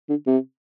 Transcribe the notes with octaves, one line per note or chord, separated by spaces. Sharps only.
D3
C3